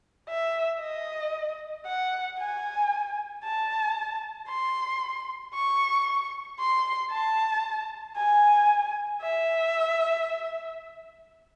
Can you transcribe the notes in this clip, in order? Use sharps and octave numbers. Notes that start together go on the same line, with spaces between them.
E5
D#5
F#5
G#5
A5
C6
C#6
C6
A5
G#5
E5